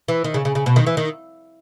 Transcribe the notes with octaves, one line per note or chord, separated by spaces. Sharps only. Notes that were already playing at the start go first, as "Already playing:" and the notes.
E3
D#3
C#3
C#3
C#3
B2
D#3
E3
D#3